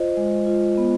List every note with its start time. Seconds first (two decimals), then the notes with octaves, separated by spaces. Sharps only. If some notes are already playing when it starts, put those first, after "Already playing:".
Already playing: F4 C5 D#5
0.17 G#3
0.47 F4
0.78 B3